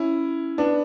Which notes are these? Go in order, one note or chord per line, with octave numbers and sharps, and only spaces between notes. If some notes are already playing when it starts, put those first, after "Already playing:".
Already playing: C#4 E4
B3 D4